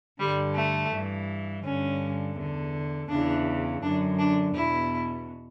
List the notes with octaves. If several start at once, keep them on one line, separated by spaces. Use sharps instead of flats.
G2 D3 G3
A3
G2 E3
G2 D3 C#4
E2 D3
E2 C#3 E3 D4
F#2 D3 D4
D4
E2 B2 E4